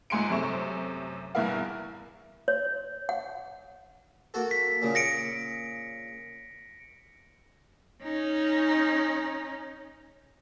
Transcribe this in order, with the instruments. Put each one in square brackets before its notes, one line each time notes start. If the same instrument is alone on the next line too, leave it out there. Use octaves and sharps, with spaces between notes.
[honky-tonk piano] C#2 G#2 G#5 C6 C#7 D7
F#2 C3 A3 C#6 E7
E2 G2 B2 E4 A#4 F5
[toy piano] C#5
F#5
[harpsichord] A#3 F#4 A4
[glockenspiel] B6
[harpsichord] A#2 C#3
[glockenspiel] A#6 C#7 D7
[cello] C#4 D#4